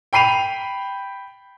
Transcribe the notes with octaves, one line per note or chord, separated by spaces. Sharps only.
G5 B5 C7 D#7 F7